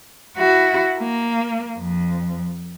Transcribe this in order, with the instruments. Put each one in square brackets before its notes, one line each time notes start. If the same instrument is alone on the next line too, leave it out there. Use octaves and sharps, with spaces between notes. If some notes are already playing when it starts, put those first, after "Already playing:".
[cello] E4 F#4
A#3
F2